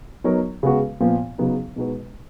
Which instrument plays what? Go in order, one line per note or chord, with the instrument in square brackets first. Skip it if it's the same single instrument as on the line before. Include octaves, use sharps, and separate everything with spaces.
[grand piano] F#3 B3 D#4 A#4 C#5
C#3 G#3 B3 F#4 B4
A#2 F3 B3
C#3 F#3 B3 D#4
B2 G#3 D#4 F#4 B4